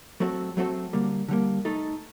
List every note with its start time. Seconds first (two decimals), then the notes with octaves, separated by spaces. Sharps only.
0.20 F#3 A3 C4 F#4 A4
0.57 F#3 A3 C4 F#4 A4
0.93 D3 G3 A#3
1.28 D3 G3 A#3
1.65 A3 D#4 A4